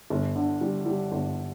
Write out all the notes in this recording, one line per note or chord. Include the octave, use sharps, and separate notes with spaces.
G1
D3
G3
G3
G1